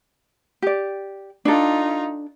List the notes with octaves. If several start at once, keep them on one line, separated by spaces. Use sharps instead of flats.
G4 D5
D4 D#4 F4 A4